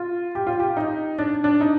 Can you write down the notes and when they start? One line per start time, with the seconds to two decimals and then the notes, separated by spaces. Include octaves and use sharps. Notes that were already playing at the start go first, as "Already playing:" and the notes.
Already playing: F4
0.35 G4
0.47 F4
0.60 G4
0.77 D#4
1.19 D4
1.44 D4
1.61 D#4